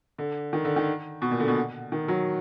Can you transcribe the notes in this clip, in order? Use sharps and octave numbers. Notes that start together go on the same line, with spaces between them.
D3
D#3
D3
D#3
B2
A#2
D3
B2
D#3
F#3